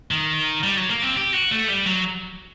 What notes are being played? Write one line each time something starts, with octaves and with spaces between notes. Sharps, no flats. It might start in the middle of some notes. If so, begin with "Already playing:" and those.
D#3
G3
F#3
A#3
C4
G4
F#4
A3
G3
F#3